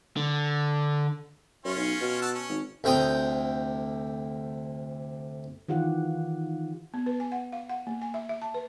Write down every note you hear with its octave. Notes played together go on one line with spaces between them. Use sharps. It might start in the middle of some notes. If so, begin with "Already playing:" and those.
D3
F#2 C#4 F4
B1
B2
F#5 A5 E6
C#4
G#1
D2 C3 G5 A#5 D#6
D#3 E3 F4 G4 F#5
B3
B4
G#5
F#5
F5
F#5
A#3
G#5
E5
E5
A5
B4